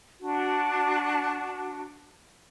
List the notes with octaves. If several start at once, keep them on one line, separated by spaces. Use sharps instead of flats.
D4 F#4